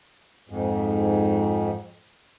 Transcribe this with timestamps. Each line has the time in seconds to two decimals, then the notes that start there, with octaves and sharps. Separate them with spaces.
0.49 F2 G#2